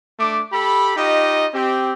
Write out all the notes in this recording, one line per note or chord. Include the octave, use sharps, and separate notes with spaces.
A3 D4 D6
G4 A4 B5
D#4 F4 G4 D#5
C4 G4